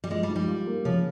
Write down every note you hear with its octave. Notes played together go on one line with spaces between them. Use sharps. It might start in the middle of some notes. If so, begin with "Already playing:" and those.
G3
F3 G#3
G3
G#2
G3
F4
A#3
C#3 F3